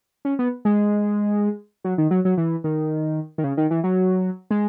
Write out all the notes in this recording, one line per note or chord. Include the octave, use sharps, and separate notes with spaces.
C#4
B3
G#3
F#3
D#3
F#3
F#3
E3
D#3
D#3
C#3
D#3
E3
F#3
G#3